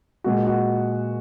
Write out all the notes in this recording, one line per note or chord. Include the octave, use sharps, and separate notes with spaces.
A#2 G#3 F#4
F#4